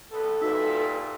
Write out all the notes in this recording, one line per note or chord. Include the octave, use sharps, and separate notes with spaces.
C2 B3 A4
G2 A#2 D#4 F#4 B4 E5